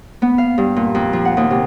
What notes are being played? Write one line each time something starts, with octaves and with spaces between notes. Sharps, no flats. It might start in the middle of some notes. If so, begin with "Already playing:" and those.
B3
F5
G2
A#2
F2
F3
F#5
D#2
C3